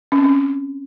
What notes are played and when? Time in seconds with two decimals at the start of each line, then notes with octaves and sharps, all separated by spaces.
0.12 C#4
0.18 C4
0.24 C#4